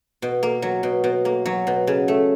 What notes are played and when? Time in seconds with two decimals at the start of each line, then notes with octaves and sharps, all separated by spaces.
0.22 B2
0.43 A#3
0.62 F#3
0.83 B2
1.04 B2
1.25 A#3
1.46 F#3
1.67 B2
1.87 C#3
2.08 A3